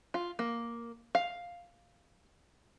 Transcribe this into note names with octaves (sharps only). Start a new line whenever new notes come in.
F4
A#3
F5